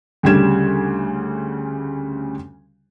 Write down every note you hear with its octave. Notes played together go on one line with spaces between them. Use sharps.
D2 C#3 G3 G4 G#6 E7